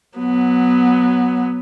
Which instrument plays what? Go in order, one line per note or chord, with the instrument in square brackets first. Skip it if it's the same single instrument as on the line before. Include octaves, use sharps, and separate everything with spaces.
[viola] F#3 B3